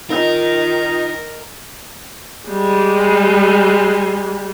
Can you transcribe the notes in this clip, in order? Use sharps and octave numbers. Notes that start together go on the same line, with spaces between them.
D#3 D#4 F4 A#4
G3 G#3